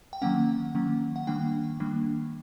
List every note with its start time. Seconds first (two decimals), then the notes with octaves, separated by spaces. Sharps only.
0.13 G5
0.22 D#3 F#3 A#3 C#4 F#5
0.75 D#3 F#3 A#3 C#4
1.16 F#5
1.27 D#3 G3 A#3 D4 G5
1.80 D#3 G3 A#3 D4